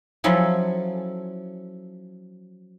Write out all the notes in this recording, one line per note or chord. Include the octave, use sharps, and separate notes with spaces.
F3 F#3 C#4 E4 A4